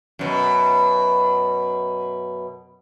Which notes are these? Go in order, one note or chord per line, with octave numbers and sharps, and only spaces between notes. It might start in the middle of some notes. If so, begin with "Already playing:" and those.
F#2 B2